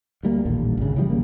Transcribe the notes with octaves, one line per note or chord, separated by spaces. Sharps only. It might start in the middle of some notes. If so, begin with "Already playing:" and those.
D2 G3 A#3
A1 D#2 A#2 D3
G#1 C#2 C#3
C#3 E3 F3 G3
C2 A#3